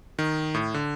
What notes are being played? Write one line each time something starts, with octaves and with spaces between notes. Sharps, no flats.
D#3
A2
D3